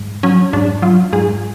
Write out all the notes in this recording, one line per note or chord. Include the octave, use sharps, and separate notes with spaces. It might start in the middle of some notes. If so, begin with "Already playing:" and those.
Already playing: G#2
F#3 C#4
G#2 D4
F#3 F4
G#2 G#4